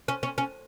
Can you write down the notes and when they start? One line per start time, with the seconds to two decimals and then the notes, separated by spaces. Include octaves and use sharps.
0.08 C#4
0.23 C#4
0.38 C#4